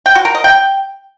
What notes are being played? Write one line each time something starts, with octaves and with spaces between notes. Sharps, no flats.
G5
F#4
A#4
D#5
G5